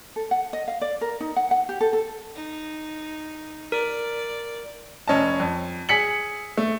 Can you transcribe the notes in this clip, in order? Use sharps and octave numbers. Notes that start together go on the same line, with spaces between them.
A4
F#5
D#5
F5
D5
A#4
D#4
F#5
F#5
G4
A4
A4
D#4
A#4 D5
F1 C#4 D#5 A5
F2
G#4 B6 C#7 F#7
A3